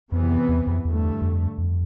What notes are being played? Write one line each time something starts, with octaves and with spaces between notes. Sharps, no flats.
F2 C3 E3 B3
E2
F2
E2 G2 D3 A3
F2
F2